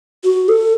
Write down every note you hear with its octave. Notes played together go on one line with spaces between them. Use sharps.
F#4
A4